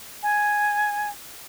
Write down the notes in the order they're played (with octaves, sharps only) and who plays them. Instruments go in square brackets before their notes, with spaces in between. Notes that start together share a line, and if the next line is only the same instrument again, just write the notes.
[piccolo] G#5